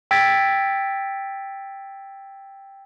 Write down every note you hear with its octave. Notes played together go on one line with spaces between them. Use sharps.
G5 E6 G#6 A6 B6 D7